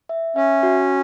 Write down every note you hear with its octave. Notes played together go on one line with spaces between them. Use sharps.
E5
C#4 E5
F#4